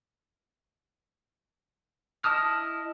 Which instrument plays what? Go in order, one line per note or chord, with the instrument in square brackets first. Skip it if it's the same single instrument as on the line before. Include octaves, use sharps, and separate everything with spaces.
[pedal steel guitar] E4 D#5 A5 D#6 F6